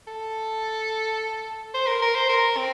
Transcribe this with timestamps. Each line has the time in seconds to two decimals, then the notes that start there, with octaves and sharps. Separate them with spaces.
0.08 A4
1.74 C5
1.87 A#4
2.02 A#4
2.15 C5
2.29 A#4
2.57 C4